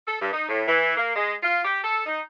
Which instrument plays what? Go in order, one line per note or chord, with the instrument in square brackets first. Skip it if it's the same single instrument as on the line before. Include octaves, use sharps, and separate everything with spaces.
[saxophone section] A4
G2
D#4
A2
E3
A#3
G#3
F4
G4
A4
D#4